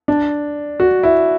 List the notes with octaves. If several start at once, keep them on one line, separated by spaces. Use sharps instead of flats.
D4
F#4
E4